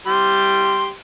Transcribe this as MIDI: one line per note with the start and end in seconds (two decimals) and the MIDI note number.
0.07 0.92 55
0.07 0.92 67
0.07 0.92 84